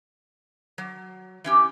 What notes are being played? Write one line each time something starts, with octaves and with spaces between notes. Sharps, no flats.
F#3
E3 C#4 G4